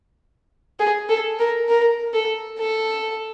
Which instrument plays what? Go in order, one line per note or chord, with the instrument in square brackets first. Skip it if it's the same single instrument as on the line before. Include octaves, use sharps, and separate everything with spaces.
[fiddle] G#4
A4
A#4
A#4
A4
A4